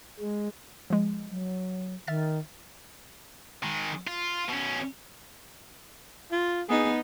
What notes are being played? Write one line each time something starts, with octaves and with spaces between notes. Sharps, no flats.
G#3
F3 G#3
F#3
D#3 E5 F6 A6
D#3 G#3
F4
B2 C#4
F4
B3 D#4 G#4